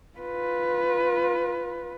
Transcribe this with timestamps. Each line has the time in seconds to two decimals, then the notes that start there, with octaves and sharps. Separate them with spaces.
0.18 F4 B4